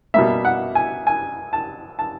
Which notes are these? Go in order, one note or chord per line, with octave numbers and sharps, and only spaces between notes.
B2 G3 A#3 E5
F#5
G#5
G#5
A5
A5